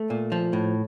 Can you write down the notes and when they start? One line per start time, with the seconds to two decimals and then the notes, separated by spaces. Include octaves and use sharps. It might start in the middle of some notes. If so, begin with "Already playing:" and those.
Already playing: A3
0.10 A#2
0.32 F3
0.53 A2